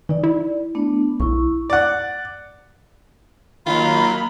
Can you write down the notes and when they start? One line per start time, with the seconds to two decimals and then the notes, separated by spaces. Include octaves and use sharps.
0.09 E3 D#4 D5
0.23 E4 D5
0.75 A3 B3 D4
1.20 B1 E4 C#6
1.70 D5 F#5
3.66 D#3 F#3 A#3 F4 B5